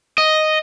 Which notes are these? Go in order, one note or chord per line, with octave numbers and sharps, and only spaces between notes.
D#5